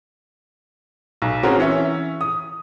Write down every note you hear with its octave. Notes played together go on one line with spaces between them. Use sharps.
B1
C4 C#4 F#4 G#4 A#4
E3 C#4 E5
D#6